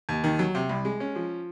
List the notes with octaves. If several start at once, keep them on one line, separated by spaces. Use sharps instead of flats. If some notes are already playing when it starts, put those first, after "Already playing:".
D#2
D#3
F#3
C3
C2
G#3
C#4
F3